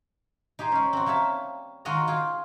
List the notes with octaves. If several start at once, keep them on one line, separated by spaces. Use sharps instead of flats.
D#4 G4 G#4 C5
G#3 C#4
C4 F#4
G3 A#3 C#5 E5 A5
D#3 G#3 F4 F#4 D#5 A#5
F4 G#4 G5